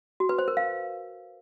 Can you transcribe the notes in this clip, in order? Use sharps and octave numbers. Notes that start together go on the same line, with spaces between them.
F#4
B4
C5
A#4
F5